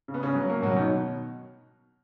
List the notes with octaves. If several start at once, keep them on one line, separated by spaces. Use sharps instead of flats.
C#3
B3
C#3 C#4
F#3
A#3 A#4
B2 F#3 F#4
C#4
D#3 D#4